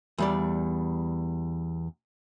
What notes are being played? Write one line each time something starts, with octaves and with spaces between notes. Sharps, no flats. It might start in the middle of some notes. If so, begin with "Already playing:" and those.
E2 G3 D5